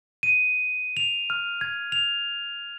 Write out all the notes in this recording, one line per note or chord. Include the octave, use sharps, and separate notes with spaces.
D#7
F7
F6
G#6
F7